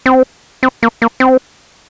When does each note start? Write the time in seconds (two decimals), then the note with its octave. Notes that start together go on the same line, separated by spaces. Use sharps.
0.06 C4
0.63 C4
0.83 A#3
1.02 A#3
1.20 C4